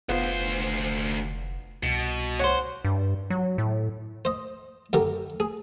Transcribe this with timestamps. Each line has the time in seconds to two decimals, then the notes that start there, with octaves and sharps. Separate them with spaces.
0.09 F1 D2 B3 F4 C5
1.83 C2 B2
2.40 C5 C#5 F#5
2.85 G2
3.30 F#3
3.58 A2
4.25 C5 D#5
4.93 F#2 D3 G4 A#4
5.40 G#4